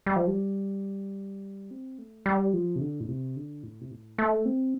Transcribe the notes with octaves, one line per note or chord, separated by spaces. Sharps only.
G3
F3
G3
C4
A3
G3
F3
C3
D3
A2
C3
D3
A2
C3
A2
A3
C4